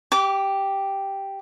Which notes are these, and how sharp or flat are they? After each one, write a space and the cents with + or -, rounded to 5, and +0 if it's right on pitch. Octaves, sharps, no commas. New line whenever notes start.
G4 +0 D6 -25